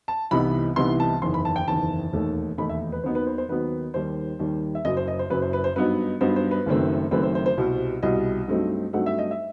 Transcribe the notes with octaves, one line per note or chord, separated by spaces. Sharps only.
A5
C2 C3 E3 B3 D#4 B5
C2 C3 E3 B3 D#4 C6
A5
F#1 E2 D#3 C6
B5
A5
G5
F#1 E2 D#3 A5
E1 D#2 D#3 A3 D#4
E1 D#2 D#3 A3 D#4 B5
E5
B4
D#2 D#3 F#3 B3 D#4 C5
B4
C5
C5
D#2 D#3 F#3 B3 D#4 B4
D#2 D#3 G3 C5
D#2 D#3 G3
E5
F#1 F#2 F#3 D#5
C5
D#5
C5
F#1 F#2 F#3 B4
C5
B4
C5
G2 F#3 B3 D#4 B4
G2 F#3 B3 D#4 C5
C5
B4
F#1 F#2 D#3 A3 C4
F#1 F#2 D#3 A3 C4 B4
C5
C5
C5
C2 B2 G3
C2 B2 G3 D#5
G2 F#3 A3 C4 D#4
G2 F#3 A3 C4 D#4 F#5
E5
D#5
E5